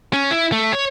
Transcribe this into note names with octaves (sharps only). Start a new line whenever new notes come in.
C#4
E4
A3
C#5